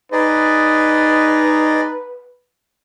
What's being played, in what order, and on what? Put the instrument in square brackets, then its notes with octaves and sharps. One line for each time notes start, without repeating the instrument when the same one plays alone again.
[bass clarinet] D#4 [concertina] G#4 D5 D#5 [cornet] B4